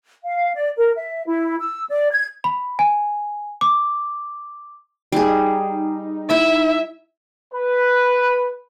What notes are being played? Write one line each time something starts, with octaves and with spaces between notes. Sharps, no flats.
F5
D5
A#4
E5
E4
E6
D5
G#6
B5
G#5
D6
G3 D#4 G#4
E4 E5 B5
B4